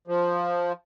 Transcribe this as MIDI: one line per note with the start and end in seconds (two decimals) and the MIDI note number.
0.07 0.72 53